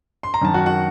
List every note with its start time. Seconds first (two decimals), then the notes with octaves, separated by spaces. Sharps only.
0.23 C6
0.34 A#5
0.41 F#2 D#3 A5
0.54 F#4 F#5
0.66 F#4 F#5